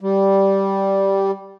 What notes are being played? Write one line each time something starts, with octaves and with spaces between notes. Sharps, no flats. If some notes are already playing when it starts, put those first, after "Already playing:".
G3